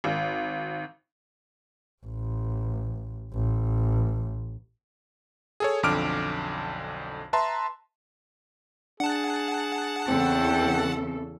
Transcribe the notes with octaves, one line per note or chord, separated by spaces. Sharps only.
G#1
A1
A1
G#4 A4 C#5
B1 F2 D3 D6 F6 D7
B4 E5 A5 A#5 C6
D4 G#4 F#5 A5
E2 C#3 C4 A4 G5